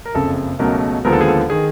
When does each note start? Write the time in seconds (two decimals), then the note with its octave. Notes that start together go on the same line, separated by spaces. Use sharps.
0.05 A#4
0.14 F#1 F2 C#3 A4
0.59 C#2 B2 F#3 A3 A#4
1.05 D#2 D3 F3 G#3 B3 A#4
1.13 A4
1.21 G#4
1.28 A4
1.50 D#3 G#4